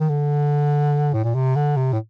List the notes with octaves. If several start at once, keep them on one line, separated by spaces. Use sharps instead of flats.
D#3
D3
A2
A#2
C3
D3
C3
A2